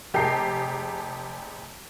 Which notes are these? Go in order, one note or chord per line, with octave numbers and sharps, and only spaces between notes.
F1 G4 G#4 A5 A#5 C7